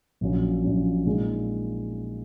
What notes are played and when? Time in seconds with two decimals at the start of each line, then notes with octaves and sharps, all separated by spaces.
0.21 A#1 A#2 F#3 C#4
0.64 A#1 A#2 F#3 C#4
1.06 A#2 G#3 D#4